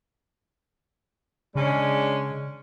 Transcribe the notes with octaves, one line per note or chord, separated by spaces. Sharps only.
C#3 G#3 C#4 D4